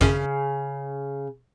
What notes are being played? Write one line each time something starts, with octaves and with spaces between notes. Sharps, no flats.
G#1 F#2 C#3 C#4